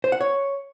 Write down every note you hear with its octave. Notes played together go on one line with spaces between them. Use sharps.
C5
F#5
C#5